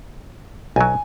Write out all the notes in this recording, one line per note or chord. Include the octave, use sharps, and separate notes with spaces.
B1 F#3 G#5